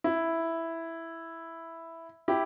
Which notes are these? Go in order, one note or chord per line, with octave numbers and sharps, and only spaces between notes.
E4
E4 G4